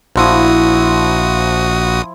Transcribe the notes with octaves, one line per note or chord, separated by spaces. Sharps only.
A#1 F3 E4 F#4 D#6